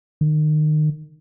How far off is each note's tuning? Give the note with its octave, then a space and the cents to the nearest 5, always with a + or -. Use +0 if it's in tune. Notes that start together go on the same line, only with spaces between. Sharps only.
D#3 -30